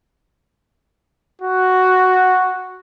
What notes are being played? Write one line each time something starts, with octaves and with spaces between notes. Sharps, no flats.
F#4